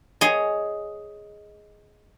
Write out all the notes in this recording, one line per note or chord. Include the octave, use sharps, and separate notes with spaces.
G#4 C#5 D#5